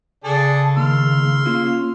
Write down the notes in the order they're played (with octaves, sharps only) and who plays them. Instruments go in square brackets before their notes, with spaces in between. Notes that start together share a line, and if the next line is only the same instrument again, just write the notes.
[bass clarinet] C#3 [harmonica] D4 G#4 A4 [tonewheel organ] A5
[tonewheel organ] D#3 A#3 [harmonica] C6 E6 F6
[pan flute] A#3 [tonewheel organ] C#4 [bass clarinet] F4